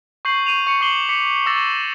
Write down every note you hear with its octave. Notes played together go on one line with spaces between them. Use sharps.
C#6 G6 C7 F#7
C#6 D#7 F7
C#6 C#7 D#7
C#6 D6 C7 E7 F#7 G7
D6 B6 C#7
C#6 D6 E6 A6 A#6 E7